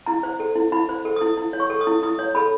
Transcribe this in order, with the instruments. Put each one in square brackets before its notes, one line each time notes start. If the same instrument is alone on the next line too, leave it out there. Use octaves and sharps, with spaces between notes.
[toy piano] E4 A#5
C5
A4
E4
E4 B5
C5
A4
D#6
E4
E4
C#5
C#6
A4
D#6
E4
E4 D#6
C#5
A4 B5